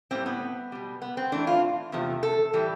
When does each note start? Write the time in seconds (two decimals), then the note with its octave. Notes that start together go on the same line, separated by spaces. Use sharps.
0.11 A2 G3 C4
0.26 B3
0.72 B2 G3
1.02 B3
1.17 C4
1.32 A2 E3 A3 D4
1.47 F4
1.92 E2 C3 F3 A3
2.23 A4
2.53 A2 E3 G3